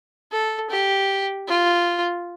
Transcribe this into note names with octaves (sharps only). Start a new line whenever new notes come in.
A4
G4
F4